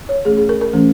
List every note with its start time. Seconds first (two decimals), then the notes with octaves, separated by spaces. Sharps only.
0.09 C#5
0.25 E3 A3 C#4 G#4
0.38 G#4
0.49 A#4
0.61 A#4
0.73 E3 A3 C#4